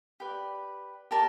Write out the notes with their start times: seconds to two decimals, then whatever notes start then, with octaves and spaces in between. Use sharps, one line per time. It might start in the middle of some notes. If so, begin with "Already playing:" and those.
0.20 G4 B4 D5
1.11 G4 A#4 D5 A5